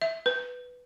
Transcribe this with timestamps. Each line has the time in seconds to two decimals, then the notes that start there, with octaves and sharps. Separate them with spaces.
0.02 E5
0.26 B4